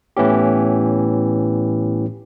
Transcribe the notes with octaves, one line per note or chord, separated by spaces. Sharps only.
A2 E3 B3 C#4 G4